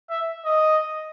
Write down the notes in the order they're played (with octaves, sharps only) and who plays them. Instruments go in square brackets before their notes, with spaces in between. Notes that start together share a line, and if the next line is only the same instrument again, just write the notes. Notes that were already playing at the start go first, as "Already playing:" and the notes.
[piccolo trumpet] E5
D#5